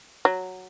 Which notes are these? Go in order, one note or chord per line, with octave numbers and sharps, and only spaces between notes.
F#3